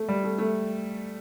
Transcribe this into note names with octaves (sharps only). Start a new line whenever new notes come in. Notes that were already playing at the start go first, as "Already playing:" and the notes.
Already playing: A3
G3
A3
A3